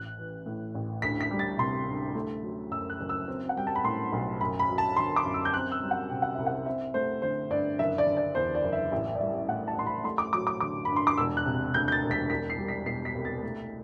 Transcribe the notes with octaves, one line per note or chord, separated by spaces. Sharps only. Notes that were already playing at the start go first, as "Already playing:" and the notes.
Already playing: A1 F#6
E3
A2
A1
D2 B6
B6
G3
A6
C3 C6
D2
A3
F#3
F#2 E6
F#6
F#1
E6
C4
F#5
G3 G5
A5
B5
A2 C6
B1
F#2 B5
B5
F#3
A5
D3 C6
D6
F#2
E6
G6
C4 F#6
E6
G3
F#5
C3 G5
F#5
C2 E5
F#5
C4 E5
A3 C5
D3 C5
G2 D5
F#1 E5
D5
D3
D5
E2 C5
D5
F#1
E5
A1 E5
D5
G3 E5
A2 F#5
A5
A1 C6
B5
A3 C6
D6
F#3 D6
D6
D3 D6
G2 B5
C6
D6
E1 E6
F#6
C3
D2 G6
G6
A6
E1
B6
C2 B6
C7
G3
B6
B2 C7
B6
C2
A6
A3